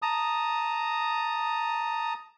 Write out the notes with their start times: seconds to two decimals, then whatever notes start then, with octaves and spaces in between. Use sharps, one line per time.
0.02 A5 A#5 D#6